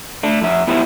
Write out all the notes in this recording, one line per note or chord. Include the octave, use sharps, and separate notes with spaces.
A3 D4
F2 E5
B3 E4 G4 C5 E5